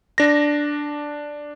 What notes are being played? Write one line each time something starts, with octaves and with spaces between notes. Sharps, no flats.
D4 A#6